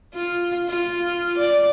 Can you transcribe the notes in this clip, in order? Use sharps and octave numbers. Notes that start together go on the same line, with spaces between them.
F4
F4
D5